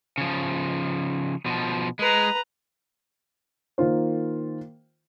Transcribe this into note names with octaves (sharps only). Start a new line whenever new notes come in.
C#3 F3
B2 F3
G#3 B4 A#5
D#3 A#3 F4 C5